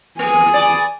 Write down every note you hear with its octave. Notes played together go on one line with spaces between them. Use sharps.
A#3 G#4 G#5
B3 D5